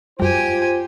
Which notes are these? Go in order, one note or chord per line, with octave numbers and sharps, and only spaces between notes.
F#2 G3 F4 G4 C5 G#5